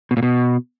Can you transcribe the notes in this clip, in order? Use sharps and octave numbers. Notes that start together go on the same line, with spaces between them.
B2
A#2
B2